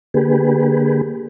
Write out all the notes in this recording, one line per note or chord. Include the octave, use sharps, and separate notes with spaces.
D3 A#3 G4 G#4 B4